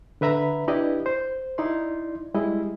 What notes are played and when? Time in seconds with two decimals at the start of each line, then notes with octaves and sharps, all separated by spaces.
0.21 D3 B4 E5 A#5 B5
0.68 D4 E4 G4 B4 D5 D#5
1.06 C5
1.58 D#4 E4 D5 C6
2.34 G3 G#3 E4 D#5